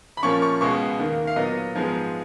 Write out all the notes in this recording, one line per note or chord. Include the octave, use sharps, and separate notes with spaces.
B5
A#2 F3 A#3 C#4 C#6
C#6
C#2 B2 G#3 B3 C#6
D#2 D#3 A#3
F5
A#2 F#3 B3 D#5
G#2 F3 G#3 B3